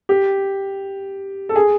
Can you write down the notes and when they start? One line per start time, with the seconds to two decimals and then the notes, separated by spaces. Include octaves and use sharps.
0.09 G4
1.49 A4
1.56 G#4